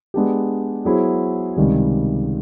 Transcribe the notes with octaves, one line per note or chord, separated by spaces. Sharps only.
G#3 B3 D4 G4
F#3 B3 E4 G#4 C5
C#2 C3 D#3 G3